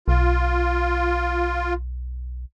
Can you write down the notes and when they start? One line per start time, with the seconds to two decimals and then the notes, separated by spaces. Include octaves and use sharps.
0.08 B1 F4